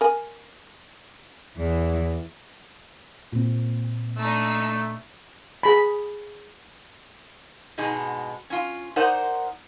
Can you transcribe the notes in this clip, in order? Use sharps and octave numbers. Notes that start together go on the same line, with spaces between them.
A#4 G#5
E2 E3
A#2 C4
A3 D4 D#4 E6
G#4 B5
G#2 B2 G#3 D#4
C#4 F4
D#4 A#4 C5 D5 F#5